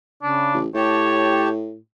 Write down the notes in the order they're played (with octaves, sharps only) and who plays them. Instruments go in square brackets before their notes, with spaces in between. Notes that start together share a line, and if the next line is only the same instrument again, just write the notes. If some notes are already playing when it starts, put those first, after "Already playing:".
[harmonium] C#3 [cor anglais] D4
[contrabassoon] A1
[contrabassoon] A2 [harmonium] G4 G5 A5 [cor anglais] C#5